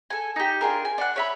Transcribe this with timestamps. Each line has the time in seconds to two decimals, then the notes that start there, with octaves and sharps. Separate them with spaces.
0.10 A4 G#5
0.36 D#4 G4
0.61 D4 F4 G#4 A#4
0.85 G#5
0.98 D4 F#5 F#6
1.16 C#5 E5 B5